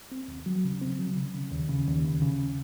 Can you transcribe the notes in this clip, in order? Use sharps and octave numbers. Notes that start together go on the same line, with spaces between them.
C4
D#2
F#3
C#3
C4
F#3
C#3
C#3
D#2
C#3
D#2
C#3
C#3